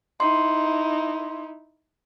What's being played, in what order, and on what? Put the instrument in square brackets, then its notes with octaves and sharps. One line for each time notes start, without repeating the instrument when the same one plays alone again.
[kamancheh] D#4 E4 [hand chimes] C6